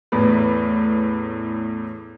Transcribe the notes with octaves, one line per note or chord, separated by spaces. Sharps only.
E2 A2 B4